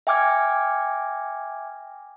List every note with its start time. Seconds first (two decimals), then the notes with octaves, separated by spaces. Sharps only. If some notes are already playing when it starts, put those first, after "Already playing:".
0.07 E5 G5 G#5 D6 F6 G#6